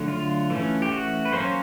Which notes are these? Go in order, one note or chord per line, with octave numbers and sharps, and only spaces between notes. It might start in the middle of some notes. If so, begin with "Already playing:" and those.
Already playing: D3 F#3 A3
F4
E3 A3 C#4
G4
F#4
B4
F#3 A#3 C#4 C5